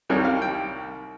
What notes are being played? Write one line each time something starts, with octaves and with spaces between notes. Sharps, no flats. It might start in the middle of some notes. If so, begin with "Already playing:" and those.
C2 C3 D#3 G3 C#5
F5
G5